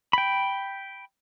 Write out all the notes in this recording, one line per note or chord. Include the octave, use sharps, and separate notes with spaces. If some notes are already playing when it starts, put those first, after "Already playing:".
G5 B5